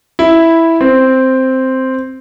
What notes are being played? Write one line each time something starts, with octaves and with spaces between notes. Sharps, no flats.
E4
C4